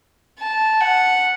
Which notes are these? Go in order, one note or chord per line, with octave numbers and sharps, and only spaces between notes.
A5
F#5